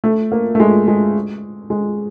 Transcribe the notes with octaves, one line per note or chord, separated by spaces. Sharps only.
A3
A#3
A3
G#3
G#3
G#3